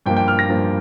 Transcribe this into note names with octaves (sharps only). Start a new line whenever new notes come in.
G2 F3 A#3 G5
G5
F6
A#6
G2 F3 A#3